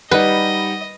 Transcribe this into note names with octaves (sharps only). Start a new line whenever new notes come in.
G3 D#4 B4 D#5 F#5